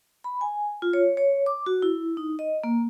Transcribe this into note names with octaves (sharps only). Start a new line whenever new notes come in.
B5
G#5
F4
C#5
C#5
D6
F#4
E4
D#4
D#5
A#3